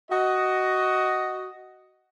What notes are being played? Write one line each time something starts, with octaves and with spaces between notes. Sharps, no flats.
F#4 D#5